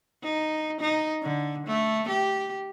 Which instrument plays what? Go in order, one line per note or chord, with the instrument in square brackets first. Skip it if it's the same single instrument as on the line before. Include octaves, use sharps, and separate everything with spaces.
[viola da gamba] D#4
D#4
D3
A3
G4